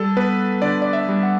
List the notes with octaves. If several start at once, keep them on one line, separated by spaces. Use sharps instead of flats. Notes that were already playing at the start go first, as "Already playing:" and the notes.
Already playing: G3 A4
B3 B4
D3 D5
D5
E5
G3
F#5